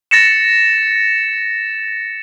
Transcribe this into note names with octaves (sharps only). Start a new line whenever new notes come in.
A6 A#6 C#7 E7